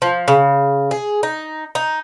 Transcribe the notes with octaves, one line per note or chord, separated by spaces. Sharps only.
F3
C#3
G#4
D#4
D#4